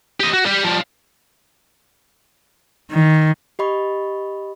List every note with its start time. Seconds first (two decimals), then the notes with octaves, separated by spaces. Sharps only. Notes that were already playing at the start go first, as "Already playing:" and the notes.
0.20 G4 D#5
0.34 F#4
0.45 G3 G4
0.64 F3 G3
2.91 D#3
3.59 G4 D#5 B5 C#6